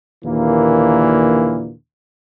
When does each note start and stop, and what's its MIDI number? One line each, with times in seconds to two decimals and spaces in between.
0.25 1.73 39
0.25 1.73 46
0.25 1.73 50
0.25 1.73 52
0.25 1.73 58